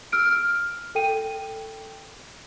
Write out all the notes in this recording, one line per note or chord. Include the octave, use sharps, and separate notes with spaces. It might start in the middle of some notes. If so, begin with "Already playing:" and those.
E6 F6 D7
F6
A4 G5 D#7